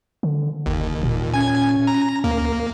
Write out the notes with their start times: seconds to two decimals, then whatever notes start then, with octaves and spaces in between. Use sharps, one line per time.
0.23 D3
0.66 F#1 D#2
1.03 A#2
1.34 C#4 G#5 G#6
1.87 A#5
2.24 D2 A#3